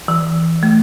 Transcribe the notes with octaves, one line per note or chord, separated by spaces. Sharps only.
E3
A3